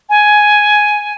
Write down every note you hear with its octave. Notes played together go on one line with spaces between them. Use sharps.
G#5